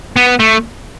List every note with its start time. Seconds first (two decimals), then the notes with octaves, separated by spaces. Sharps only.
0.16 B3
0.40 A3